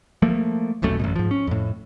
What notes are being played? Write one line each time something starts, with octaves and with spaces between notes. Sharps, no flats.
F3 A3 A#3
D#1 B1 F#2 A3
A1 F#2 B2
G#2 F3
C#4
F2 A2